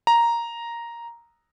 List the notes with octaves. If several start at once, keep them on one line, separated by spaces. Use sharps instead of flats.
A#5